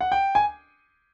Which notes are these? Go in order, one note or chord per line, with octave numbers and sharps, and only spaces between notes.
F#5
G5
G#5